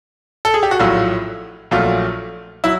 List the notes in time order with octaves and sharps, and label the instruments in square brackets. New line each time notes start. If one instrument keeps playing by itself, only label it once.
[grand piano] A4
G#4
G4
F#4
A#1 A2 F#3 A3 F4
A#1 A#2 F#3 A3 F4
F#3 E4